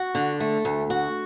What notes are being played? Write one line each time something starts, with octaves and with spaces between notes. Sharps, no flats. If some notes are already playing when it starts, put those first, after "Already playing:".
Already playing: F#4
D3
A3
D2
F#4